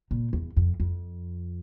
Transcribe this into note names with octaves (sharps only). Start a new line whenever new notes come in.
A#2
E2
F2
F2